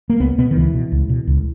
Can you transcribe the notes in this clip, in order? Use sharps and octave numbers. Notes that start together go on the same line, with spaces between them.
A#3
C#2 B3
B2 B3
D#3
C#2 E3
B2
C#2
B2
C#2